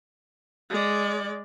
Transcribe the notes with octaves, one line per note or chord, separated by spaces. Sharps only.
G#3 D5